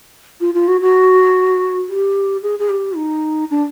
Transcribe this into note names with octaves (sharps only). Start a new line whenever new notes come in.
F4
F4
F#4
F#4
G4
G#4
G#4
G4
D#4
D4